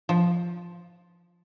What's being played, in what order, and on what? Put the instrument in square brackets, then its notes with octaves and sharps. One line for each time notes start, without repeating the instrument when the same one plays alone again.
[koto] F3